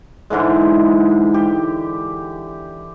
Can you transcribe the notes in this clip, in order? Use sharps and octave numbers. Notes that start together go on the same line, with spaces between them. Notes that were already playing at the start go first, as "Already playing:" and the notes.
G#2 D3 E3 G#3
G4